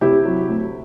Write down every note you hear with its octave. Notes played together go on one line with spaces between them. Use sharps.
C3 E4 G4
F#3
D2